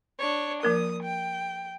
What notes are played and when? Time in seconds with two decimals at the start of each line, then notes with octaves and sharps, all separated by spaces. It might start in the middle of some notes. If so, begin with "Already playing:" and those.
0.19 D4 C#5
0.63 F3 A#3 A#4 D#6
1.03 G5